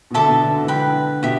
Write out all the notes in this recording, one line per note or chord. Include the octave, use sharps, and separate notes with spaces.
B2
D3 A4 E5 A5 D6
B2
D3
D3
E3
D3 B4 G5 B5
B2 G4 E5